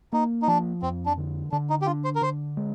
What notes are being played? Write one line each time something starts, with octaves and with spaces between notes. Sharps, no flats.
A#3 D#4
D#4
F3 D4
F2 C4
D4
D3
D3 D4
D#4
G4
D4 F4
C5
A#4
D3 C5
G#3